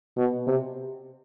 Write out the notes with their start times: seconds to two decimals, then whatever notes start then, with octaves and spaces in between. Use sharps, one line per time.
0.17 B2
0.47 C3